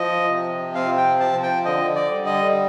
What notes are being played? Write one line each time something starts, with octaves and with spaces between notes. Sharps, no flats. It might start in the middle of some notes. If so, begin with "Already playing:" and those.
Already playing: F3 D#5
C3
C4 F5
G5
F3 A5
G5
D3 D#5
D5
G3
D#5